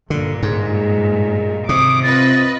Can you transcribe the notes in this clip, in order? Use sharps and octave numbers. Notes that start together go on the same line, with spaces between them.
G2 A#2 D3
G#2 G#3
G#1 C3 D6 D#6
C4 F4 B4 D#5 A6